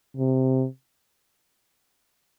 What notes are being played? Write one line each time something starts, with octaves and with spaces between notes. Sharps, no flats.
C3